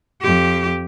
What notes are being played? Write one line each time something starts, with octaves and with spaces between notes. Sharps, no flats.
F2 G4